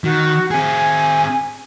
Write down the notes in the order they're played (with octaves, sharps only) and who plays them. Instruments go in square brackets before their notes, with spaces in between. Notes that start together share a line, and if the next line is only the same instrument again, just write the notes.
[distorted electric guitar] D#3 [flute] F#4
[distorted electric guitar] C4 G#4 [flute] G#5